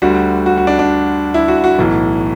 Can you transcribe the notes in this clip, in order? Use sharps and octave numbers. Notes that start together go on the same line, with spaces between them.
D2 D3 G3 F#4
F#4
F#4
D4
D4
E4
F#4
F#4
B1 A2 E3